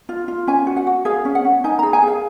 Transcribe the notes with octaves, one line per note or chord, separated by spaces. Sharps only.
F4
F4
C#4 G#5
F#4
F#5
F#4
G#4 F5
C#4
F#5
C#4
D#4 G#5
A#5
G#4
G#5
G#4 F5